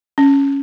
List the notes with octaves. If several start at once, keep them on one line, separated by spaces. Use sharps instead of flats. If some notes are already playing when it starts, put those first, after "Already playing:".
C#4